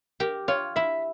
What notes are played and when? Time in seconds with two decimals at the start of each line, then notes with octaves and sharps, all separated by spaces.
0.20 G4 A#4
0.48 F4 C#5
0.76 E4 E5